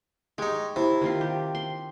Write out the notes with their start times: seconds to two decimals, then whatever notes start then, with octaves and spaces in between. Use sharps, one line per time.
0.38 G#3 D#4 G4 C#5
0.76 C3 E4
1.02 D#3 C4 F4
1.21 G4
1.55 C6